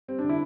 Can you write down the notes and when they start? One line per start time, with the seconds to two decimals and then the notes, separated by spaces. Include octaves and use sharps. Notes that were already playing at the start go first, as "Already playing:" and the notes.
0.08 G3 C4
0.19 D4
0.24 D3
0.29 E4